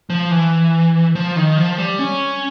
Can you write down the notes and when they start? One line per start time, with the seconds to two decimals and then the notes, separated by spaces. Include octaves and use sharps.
0.10 F3
0.31 E3
1.15 F3
1.36 D#3
1.57 F3
1.78 G3
1.99 C#4